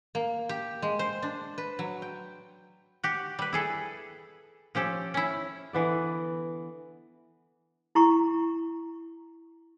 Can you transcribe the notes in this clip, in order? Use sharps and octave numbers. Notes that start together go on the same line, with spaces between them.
A#3
G4
G#3
C5
D4
B4
F#3
G5
F#4 G4
G3 B4
E4 G#4 A4
F3 C#4 G4 A4
C#4 E4
D3 E3 B3 D5
E4 A#5 C#6